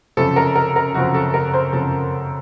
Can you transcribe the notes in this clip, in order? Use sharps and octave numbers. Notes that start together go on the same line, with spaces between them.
F#2 C#3 F3 C4 A4
A#4
A#4
A#4
F#2 C#3 F3 C4 F#4
A4
A#4
C5
C#3 F3 C4 A4